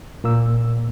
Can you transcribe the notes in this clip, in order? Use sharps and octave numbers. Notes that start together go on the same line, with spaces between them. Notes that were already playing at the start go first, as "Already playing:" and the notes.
A#2 A#3 E6